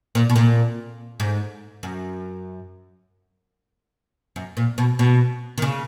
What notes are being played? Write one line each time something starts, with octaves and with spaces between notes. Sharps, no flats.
A#2
B2
A#2
G#2
F#2
F#2
A#2
B2
B2
D#3
C#3